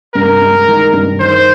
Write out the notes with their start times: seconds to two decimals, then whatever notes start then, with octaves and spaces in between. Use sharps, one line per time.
0.14 G2 A#4
0.41 G#3
0.68 D#3
0.93 G2
1.20 D#3 C5